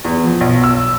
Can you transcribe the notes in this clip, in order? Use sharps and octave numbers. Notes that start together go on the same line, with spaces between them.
E2
F3
B1
E6